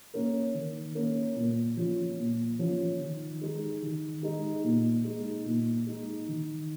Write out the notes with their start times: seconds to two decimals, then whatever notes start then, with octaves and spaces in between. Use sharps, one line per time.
0.14 A#3 C#4 A#4
0.54 D#3
0.95 A#3 C#4 A#4
1.36 A#2
1.77 F3 C#4 F4
2.18 A#2
2.59 F3 C#4 F4
2.99 D#3
3.41 G#3 D#4 G#4
3.82 D#3
4.23 G#3 D#4 G#4
4.64 A#2
5.05 G#3 D#4
5.46 A#2
5.87 G#3 D#4
6.28 D#3